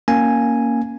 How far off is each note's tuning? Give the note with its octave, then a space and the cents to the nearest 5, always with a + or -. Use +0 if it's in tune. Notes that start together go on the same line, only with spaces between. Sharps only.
A#3 +0 C#4 +0 G#5 +0